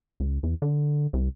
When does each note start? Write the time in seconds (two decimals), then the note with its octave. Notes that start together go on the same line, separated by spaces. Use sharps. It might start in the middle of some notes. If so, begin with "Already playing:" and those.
0.20 C#2
0.43 E2
0.62 D3
1.13 C2